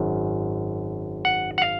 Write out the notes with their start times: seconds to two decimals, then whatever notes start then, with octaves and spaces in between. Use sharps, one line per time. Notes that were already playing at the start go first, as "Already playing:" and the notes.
Already playing: G#1 F#2
1.25 F#5
1.58 F#5
1.62 F5